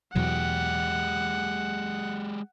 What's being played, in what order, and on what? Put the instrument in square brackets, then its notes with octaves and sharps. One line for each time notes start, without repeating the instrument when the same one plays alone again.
[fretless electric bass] E2 B2 F#3 [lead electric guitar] G#3 G4 [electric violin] F#5